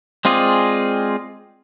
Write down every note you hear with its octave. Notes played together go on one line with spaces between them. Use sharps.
G#3 C4 F4 G#4 D5